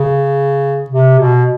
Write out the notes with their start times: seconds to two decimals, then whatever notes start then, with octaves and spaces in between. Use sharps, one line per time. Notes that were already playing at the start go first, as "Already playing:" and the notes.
Already playing: C#3
0.90 C3
1.18 B2